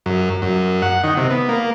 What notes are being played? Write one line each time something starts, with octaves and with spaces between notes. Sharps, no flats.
F#2
F#2
F#5
D#3
C3
B3
A#3